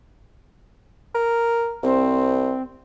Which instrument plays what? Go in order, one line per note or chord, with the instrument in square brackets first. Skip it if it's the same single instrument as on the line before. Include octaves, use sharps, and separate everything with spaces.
[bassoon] A#4
[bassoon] C2 [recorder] C4